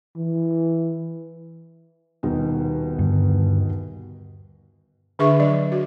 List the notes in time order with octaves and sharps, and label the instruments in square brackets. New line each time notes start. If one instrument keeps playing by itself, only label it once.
[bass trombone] E3
[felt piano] D#1 B2 D#4
[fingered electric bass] G2 D3
[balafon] D3 D4 G#4 B4 E5 C#6
F#3 D5
F#4